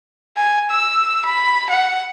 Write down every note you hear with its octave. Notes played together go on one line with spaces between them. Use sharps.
G#5
E6
B5
F#5